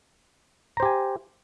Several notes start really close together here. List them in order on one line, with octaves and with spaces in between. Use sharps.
A#5 C5 G4 G#5